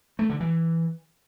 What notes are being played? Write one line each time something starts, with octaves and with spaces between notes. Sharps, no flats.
A3
D3
E3